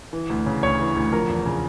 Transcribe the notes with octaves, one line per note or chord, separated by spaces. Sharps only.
E3
D2
C#3
D2 C#5
E3
D2
F3 A#4
E2
C#3